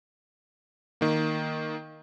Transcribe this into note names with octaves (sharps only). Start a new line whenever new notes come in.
D#3 A#3